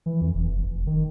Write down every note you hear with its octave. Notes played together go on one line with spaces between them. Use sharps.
E3
F2
F1
F1
D#3